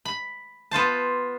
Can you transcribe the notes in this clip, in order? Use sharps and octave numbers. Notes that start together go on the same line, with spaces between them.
B5
B3 F4 C5 A5